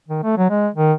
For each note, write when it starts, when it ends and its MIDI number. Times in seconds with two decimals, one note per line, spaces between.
0.08 0.22 51
0.24 0.34 57
0.38 0.49 54
0.50 0.68 56
0.75 0.93 51